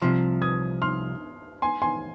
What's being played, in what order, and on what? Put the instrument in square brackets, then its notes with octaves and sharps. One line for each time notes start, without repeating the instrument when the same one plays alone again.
[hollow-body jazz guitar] C2 C3 F3 [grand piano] C6 F6
[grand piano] D#6 G#6
C6 F6
G#5 C6
G#5 C6